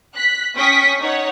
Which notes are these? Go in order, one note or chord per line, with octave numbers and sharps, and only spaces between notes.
F#6 B6
C#4 G5 C#6 D#6 B6
D#4 C#5 F#5